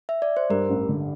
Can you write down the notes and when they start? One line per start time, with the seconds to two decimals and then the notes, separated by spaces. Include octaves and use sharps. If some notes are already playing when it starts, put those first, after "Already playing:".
0.09 E5
0.22 D5
0.37 C5
0.50 G2 A#4
0.69 A1
0.89 D3